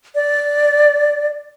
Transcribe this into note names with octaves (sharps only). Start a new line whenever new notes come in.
D5